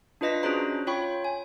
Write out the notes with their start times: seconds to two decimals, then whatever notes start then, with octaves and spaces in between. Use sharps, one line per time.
0.21 D4 F4 B4 D#5 A#6 B6
0.43 C#4 D4 F#4 G#4 C5 A#5
0.87 F4 C#5 G5 B5 C#6
1.25 G#5